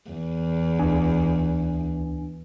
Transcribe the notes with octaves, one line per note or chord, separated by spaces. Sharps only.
E2
D2 D4 G#5